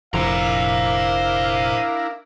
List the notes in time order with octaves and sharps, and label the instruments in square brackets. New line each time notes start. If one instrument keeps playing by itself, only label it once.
[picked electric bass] F1 F3 [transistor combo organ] D4 E4 A#4 [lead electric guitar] C5 A#5 [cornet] F5